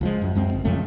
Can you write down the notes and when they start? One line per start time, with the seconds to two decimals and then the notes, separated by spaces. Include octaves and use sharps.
0.01 C#2 F3 G#3
0.22 F#2
0.35 F#2 G#3 C4
0.53 G1
0.65 F2 A#2 C#3 A3